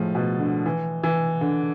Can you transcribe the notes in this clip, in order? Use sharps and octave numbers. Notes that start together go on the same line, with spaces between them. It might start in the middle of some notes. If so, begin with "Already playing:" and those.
Already playing: A2 F3 G#3
B2
D3
E3
E3
D3